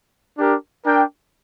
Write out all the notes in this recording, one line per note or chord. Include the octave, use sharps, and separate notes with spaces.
D4 G4 A#4
D4 A#4 G5